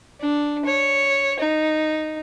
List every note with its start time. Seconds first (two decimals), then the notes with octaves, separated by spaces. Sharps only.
0.20 D4
0.65 C#5
1.40 D#4